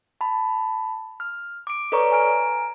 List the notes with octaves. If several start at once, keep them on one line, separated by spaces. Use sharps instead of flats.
A5 B5
F6
D6 D7
A4 B4 C#5 D5 A#5 C#6
G#5 A#5 F6 D7